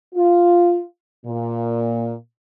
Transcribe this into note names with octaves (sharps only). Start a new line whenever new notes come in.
F4
A#2